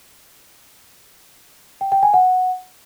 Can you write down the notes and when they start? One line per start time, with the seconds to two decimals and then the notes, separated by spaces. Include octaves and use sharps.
1.81 G5
1.92 G5
2.03 G#5
2.14 F#5